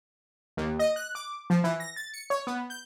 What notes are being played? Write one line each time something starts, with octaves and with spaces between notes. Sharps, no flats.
D#2
D#5
F#6
D6
F3
E3
A#6
A6
C#7
C#5
B3
G6